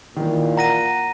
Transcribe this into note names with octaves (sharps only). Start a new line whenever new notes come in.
A#2 D#3 E3
F#5 A#5 A#6 D#7